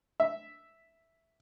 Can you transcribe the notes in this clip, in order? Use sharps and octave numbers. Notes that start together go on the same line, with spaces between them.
E5